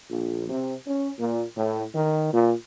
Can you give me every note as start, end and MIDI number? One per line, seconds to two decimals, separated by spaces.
0.10 0.49 34
0.49 0.74 48
0.87 1.10 61
1.19 1.42 46
1.56 1.83 45
1.94 2.31 51
2.32 2.53 46